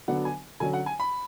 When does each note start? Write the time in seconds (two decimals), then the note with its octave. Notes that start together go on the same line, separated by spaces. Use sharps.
0.08 D3 F#3 B3 D4 F#5
0.25 G#5
0.60 D3 F#3 C#4 G#5
0.73 F#5
0.86 G#5
1.00 B5